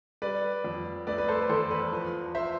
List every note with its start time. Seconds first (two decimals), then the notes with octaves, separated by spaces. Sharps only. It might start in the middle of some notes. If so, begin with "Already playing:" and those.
0.22 G3 B4 D5
0.64 F2
1.07 A3 B4 D5
1.18 B4
1.28 A4 C5
1.50 E2 A4 C5
1.71 B4
1.92 F3
2.35 C5 E5